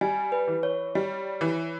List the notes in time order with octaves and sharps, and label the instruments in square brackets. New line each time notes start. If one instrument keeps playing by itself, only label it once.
[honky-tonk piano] G3 [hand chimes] G#5
[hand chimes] B4
[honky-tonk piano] E3
[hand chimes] C#5
[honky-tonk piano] G3
E3